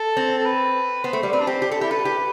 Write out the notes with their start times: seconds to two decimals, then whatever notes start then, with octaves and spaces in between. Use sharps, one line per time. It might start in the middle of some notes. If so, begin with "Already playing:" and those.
Already playing: A4
0.17 C4
0.38 A4
0.45 B4
1.04 B3 C5
1.13 A3
1.23 G3
1.32 C4 B4
1.40 D4
1.47 C4 G4
1.62 G4
1.71 D4 A4
1.81 E4 G4
1.91 A4 B4
2.05 G4